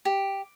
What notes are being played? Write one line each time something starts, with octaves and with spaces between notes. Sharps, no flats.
G4